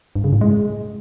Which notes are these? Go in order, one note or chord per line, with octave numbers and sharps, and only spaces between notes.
G2
C#3
A2
G#3